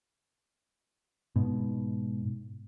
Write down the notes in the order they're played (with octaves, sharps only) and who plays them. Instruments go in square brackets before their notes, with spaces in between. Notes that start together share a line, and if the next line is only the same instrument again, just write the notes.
[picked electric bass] G#2 B2